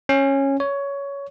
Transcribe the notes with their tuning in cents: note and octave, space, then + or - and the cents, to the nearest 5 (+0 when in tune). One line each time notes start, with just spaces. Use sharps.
C#4 -15
C#5 +15